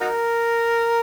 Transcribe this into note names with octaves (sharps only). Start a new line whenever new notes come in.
D#4 F#4 A#4